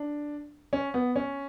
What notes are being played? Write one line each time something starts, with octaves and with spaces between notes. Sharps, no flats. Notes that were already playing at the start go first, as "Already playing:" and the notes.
Already playing: D4
C#4
B3
C#4